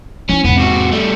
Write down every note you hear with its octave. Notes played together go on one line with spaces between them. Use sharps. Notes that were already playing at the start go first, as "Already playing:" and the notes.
F3 C#4 E4
E2 G#2 B3
C3 F#4
G3 A3